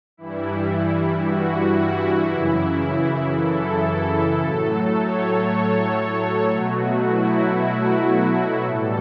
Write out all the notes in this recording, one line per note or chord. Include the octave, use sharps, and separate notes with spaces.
G2 E3 G3 E4
F#4
E4
F#2 C#3 E3 E4
A4
A2 F#3 A3 A4
C#5
C#5
C#5
B2 F#3 A3 F#4
E4
F#4
A2 E3 G3 A4